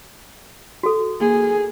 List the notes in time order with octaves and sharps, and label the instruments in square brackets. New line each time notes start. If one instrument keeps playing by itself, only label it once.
[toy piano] F#4 A4
[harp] A#3 [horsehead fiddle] G#4